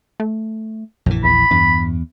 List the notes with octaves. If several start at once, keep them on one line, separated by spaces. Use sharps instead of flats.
A3
A#1 F#2 E3
E2 B5
E2 G2